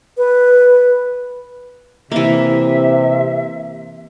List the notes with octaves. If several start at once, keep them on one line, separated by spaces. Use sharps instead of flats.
B4
C3 E3 A#3 E5